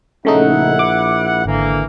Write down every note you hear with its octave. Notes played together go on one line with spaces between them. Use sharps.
A#1 C#3 A3 D#4 E4 F#5
D6
G#1 D3 E3 A#3